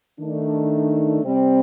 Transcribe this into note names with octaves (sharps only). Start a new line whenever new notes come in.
D#3 A3 D4
C3 G3 C4